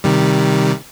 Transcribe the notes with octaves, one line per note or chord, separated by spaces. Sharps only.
C3 D#3 G3